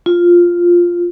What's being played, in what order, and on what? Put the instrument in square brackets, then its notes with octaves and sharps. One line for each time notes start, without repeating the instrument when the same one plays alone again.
[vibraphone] F4